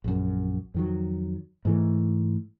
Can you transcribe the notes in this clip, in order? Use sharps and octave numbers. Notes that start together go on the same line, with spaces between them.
A#1 F#2
F2 D#3 F#3
G#2 E3 A3